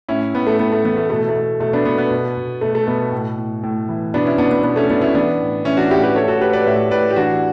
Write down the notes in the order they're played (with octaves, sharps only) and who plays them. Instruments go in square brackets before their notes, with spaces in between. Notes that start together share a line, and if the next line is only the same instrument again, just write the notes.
[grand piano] A2 C#4 E4
A2 B3
A3
A2 B3
A3
E3 B3
A3
B2 A3
A3
B2
B2 A3
B3 D4
B2 B3
B3
B2
B2
B2 A3
A3
B2 B3
A2
A2
A2
E3
B2 B3 D4
C#4 E4
B2 B3 D4
B3
B2 B3
A3 C#4
B2 B3 D4
C#4 E4
E3 B3 D4
A2
E3 C#4 E4
D4 F#4
A2 E4 G4
G4 B4
A2 A4 C#5
F#4 A4
A2 G4 B4
B4 D5
A2 C#5 E5
A2 B4 D5
G4
E3 D4 F#4